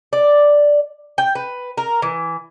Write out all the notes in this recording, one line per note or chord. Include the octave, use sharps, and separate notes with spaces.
D5
G5
B4
A#4
E3